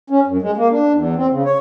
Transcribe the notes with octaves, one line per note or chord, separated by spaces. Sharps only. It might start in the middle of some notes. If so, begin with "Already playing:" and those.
C#4
F#2
G#3
A#3
D4
E2
C4
C#3
C#5